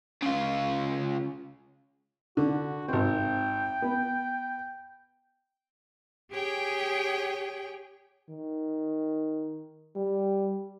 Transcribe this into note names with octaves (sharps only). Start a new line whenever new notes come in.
C#3 F4
D3 F#4
G#1 C4 G5
B3
G4 G#4 C#5 G5 G#5
D#3
G3